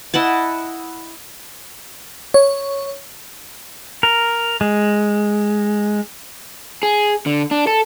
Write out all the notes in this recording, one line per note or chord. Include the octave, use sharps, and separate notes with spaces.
E4 D#5 F#5 A5
C#5
A#4
G#3
G#4
D3
D4
A4